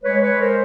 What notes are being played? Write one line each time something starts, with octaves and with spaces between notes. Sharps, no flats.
G#3 B4 C#5
B4 C#5
G#3
A#4 C5